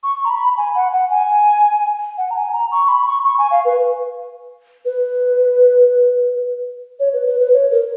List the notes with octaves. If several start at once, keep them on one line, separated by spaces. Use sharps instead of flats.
C#6
A#5
B5
G#5
F#5
F#5
G#5
F#5
A#5
G#5
A#5
C#6
C#6
B5
C#6
C#6
G#5
F5
B4
B4
C#5
B4
B4
B4
C#5
A#4